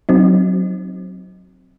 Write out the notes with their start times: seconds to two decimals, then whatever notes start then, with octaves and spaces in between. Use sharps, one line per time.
0.09 F#3 C4 D#4